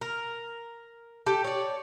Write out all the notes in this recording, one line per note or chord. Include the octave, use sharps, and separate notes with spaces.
A#4
G4 A4
C#5 D5